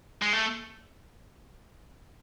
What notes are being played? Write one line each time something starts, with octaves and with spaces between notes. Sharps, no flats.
G#3
A3